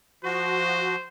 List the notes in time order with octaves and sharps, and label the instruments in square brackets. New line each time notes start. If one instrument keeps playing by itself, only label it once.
[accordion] F3 F#4 [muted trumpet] C5